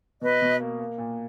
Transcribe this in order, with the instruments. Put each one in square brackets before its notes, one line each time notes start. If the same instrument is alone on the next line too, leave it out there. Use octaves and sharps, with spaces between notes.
[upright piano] B2 [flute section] B4 D#5
[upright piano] B2
A#3
A#3
A#2